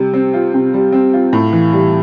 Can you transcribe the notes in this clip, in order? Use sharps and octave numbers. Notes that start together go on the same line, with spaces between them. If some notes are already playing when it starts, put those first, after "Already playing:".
Already playing: C3 G3
C4
F4
C3
G3
C4
F4
A2
E3
G3